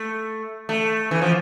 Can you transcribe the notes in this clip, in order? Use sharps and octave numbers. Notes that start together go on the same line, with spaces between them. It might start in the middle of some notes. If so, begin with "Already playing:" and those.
Already playing: A3
A3
E3
F3